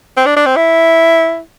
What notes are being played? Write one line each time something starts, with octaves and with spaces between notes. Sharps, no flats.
C4
D4
D4
C4
E4